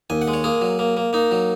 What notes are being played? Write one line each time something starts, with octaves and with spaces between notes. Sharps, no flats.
D#2 G#5
F#5
G#3
C#5
A#3 G#4
F#3
A#3
A#3
A#3 D#4
F#3